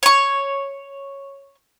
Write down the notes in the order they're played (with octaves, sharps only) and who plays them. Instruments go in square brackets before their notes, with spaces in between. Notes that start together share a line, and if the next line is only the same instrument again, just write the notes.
[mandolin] C#5 C#6